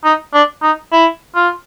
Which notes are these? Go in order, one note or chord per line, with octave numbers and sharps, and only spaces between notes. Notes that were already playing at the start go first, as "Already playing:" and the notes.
D#4
D4
D#4
E4
F4